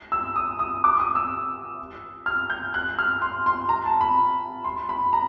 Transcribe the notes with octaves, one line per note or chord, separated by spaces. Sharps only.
E6
D#6
D#6
D6
D#6
E6
F6
G6
F#6
F6
C6
C6
A#5
A5
B5
C6
B5
A#5